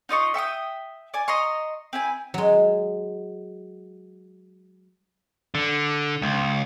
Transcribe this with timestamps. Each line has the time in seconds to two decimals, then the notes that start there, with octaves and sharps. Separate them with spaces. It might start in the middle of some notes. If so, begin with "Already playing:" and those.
0.09 D#4 F4 D#5 C#6
0.34 E5 G5 C#6 D#6
1.14 D5 G#5
1.28 D#5 A#5 C6 C#6
1.93 C4 E4 G#5
2.34 F#3 G#3
5.55 D3
6.22 C#2